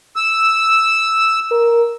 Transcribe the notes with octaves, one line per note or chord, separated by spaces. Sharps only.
E6
A#4